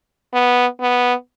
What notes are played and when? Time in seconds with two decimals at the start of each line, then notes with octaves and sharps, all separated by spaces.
0.34 B3
0.81 B3